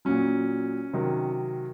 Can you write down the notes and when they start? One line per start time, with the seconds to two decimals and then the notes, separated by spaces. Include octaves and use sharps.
0.05 A#2 F#3 C#4
0.93 C3 D#3 F#3